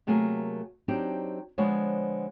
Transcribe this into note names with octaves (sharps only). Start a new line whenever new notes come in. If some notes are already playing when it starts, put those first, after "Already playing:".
C3 F#3 A3 A#3 G#4 A#4
F#3 C4 D4 D#4 G4
D3 F3 G#3 B3 C5 C#5